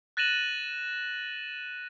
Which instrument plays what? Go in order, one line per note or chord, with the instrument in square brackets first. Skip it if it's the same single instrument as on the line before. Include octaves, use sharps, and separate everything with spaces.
[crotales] F#6 A6 A#6 D#7 E7 F#7